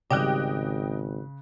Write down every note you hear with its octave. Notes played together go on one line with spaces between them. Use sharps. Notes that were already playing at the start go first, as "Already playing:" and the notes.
G#1 C#3 G3 G4 D#5 G5 F#6